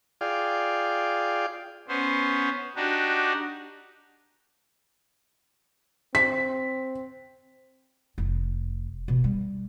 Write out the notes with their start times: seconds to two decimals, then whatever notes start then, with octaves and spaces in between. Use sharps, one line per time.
0.21 F4 G#4 D5 F5 G5
1.88 B3 C#4 C5
2.76 D4 D#4 F#4 G4
6.15 C4 B6
8.18 F1
9.08 B2
9.24 G3